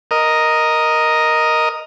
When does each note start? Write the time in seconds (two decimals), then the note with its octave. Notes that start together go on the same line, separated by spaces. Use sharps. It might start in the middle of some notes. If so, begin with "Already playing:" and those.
0.11 A#4 D#5